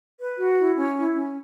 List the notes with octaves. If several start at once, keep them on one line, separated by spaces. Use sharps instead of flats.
B4
F#4
E4
C#4
E4
C#4